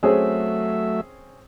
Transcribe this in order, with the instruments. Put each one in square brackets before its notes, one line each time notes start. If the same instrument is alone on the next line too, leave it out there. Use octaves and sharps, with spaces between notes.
[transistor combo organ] F#3 A3 E5 [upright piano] C4 C#4 G#4